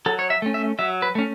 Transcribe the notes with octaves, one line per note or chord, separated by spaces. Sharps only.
F#3 A4
C#5
E5
A3 C#4
E5
F#3 E5
B4
A3 C#4